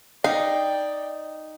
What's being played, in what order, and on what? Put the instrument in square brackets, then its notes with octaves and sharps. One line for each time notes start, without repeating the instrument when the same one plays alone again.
[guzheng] D#4 [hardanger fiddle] D5 G5 [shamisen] F5